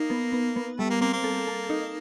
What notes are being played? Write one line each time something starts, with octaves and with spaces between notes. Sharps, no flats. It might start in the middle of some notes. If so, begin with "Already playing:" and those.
Already playing: A#3 D#4
B3
B3
B3
G3 A3
A#3
A#3 C4
A#3
A4
A4
D#4